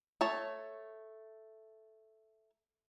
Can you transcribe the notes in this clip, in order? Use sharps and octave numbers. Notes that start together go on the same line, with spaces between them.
A3 C#5 A5